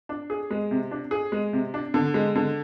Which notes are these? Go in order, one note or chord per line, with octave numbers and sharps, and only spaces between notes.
D4
G#4
G#3
C3
D4
G#4
G#3
C3
D4
D3
G#3
D3